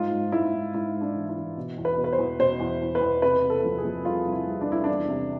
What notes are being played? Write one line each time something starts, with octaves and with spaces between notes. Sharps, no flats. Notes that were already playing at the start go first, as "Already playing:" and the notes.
Already playing: G#2 F4
G#2
G#2 E4
G#2
G#2 E4
G#2
D4
E3
E4
E3
B2
E2
B4
B2
B4
C5
E2
B2 C5
E2
E2
B4
E2
C3 B4
C3
A4
F3
G#4
F3
C2 F4
C2
E4
C2
D4
C2 E4
E2 D4
C3